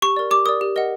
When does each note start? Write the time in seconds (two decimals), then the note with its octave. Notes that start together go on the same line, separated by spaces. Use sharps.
0.02 G4 C#6
0.17 A#4 D5
0.31 G4 D6
0.46 A#4 D5 D#6
0.61 G4
0.76 A#4 D#5 F#5